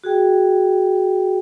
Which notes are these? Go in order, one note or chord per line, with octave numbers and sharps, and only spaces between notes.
F#4 G#4 G5